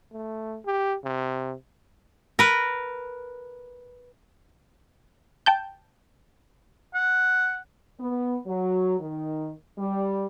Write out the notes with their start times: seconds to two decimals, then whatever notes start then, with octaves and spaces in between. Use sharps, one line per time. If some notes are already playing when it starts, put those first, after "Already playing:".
0.12 A3
0.66 G4
1.04 C3
2.39 A#4 B4
5.46 G5 A5 G6
6.95 F#5
8.00 B3
8.47 F#3
8.99 D#3
9.78 G3